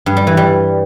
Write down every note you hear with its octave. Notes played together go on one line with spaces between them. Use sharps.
G2
G3
E3
G3